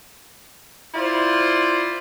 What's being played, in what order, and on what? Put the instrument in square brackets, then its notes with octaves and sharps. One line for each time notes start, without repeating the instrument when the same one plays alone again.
[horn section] E4 F4 C5 D5